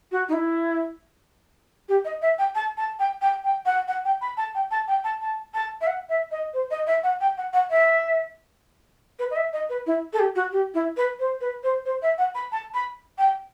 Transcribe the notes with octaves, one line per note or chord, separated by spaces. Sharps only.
F#4
D#4
E4
G4
D#5
E5
G5
A5
A5
G5
G5
G5
F#5
F#5
G5
B5
A5
G5
A5
G5
A5
A5
A5
E5
F#5
E5
D#5
C5
D#5
E5
F#5
G5
F#5
F#5
E5
B4
D#5
E5
D#5
B4
E4
A4
G4
F#4
G4
E4
B4
C5
B4
C5
C5
E5
F#5
B5
A5
B5
G5